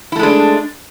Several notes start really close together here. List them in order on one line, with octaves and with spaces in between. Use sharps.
E4 A3 G#3 D4